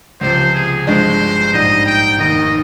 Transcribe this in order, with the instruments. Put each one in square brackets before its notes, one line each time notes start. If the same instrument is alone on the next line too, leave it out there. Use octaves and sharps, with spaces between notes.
[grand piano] C#2 C3 F3 [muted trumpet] C5
[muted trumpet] G#4
[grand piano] G1 G2 F3 G#3 [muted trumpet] C5
[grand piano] A#1 G#2 G3 [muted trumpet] D#5
[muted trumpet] G5
[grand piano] F1 D#2 D#3 [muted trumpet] D#5